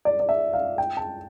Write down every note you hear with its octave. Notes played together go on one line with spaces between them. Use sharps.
D5
D5
E5
F5
G5
A5